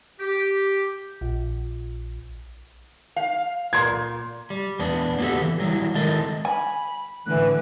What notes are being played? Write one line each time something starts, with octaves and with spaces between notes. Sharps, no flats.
G4
A#1
F5
A#2 C6 G#6
G3
E2 B3 D4
A#3 B3 F#4 G4 A4
E3
F#3 G3 E4
D#3 G#3 E4 A4 A#4 D#5
G#5 B5
A2 D3 E3 F#6